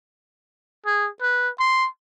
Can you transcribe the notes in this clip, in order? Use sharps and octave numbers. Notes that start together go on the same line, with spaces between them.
G#4
B4
C6